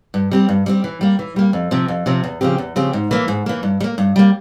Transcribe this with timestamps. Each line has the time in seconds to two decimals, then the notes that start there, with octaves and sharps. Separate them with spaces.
0.14 G2
0.31 G3 C4 G4
0.49 G2
0.66 G3 C4 G4
0.84 E3
1.01 G3 A#3
1.19 E3
1.36 G3 A#3
1.53 F2
1.71 C3 F3 C4
1.88 F2
2.06 C3 F3 C4
2.24 E2
2.41 C#3 F3 C4 G4
2.58 E2
2.76 C#3 F3 C4 G4
2.93 G#2
3.11 E3 A#3
3.28 G#2
3.46 E3 A#3
3.63 G2
3.80 G3
3.84 A#3
3.98 G2
4.16 G3 A#3